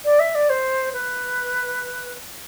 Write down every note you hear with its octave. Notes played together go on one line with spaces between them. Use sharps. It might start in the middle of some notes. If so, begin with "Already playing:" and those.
D5
E5
D5
C5
B4